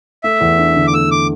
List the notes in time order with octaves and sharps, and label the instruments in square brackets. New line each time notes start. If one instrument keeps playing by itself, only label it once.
[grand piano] A3 [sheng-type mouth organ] E5
[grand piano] E2
D4
D3
[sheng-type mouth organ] D6
[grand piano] A3 [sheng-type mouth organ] E6
[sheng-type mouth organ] D6